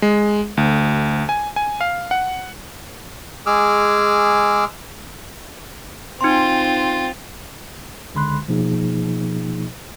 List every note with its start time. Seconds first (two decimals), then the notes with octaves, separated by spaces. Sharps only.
0.02 G#3
0.57 D2
1.29 G#5
1.56 G#5
1.81 F5
2.11 F#5
3.46 G#3 G#4 D6 E6 F6
6.21 C4 D#4 F4 C6
8.15 C#2 D3 G#3 B5 C6 F#6
8.48 B2 F3 A#3 D#4 G#4